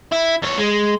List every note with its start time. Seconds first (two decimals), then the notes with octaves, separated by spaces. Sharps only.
0.12 E4
0.42 E2 C#5
0.57 G#3